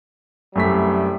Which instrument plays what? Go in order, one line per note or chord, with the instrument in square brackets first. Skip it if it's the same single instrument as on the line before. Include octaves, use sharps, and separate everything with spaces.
[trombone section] C2 G3 [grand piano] F#2 A3 B6